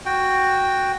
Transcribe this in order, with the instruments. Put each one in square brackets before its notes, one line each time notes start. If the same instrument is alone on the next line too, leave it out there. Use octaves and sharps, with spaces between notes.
[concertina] F#4 G5